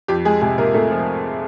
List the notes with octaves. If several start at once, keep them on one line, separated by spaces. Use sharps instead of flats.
F2 G4
G#3 G#4
C3 G#3 G#4
C3 A#3 A#4
C3 A3 A4
F3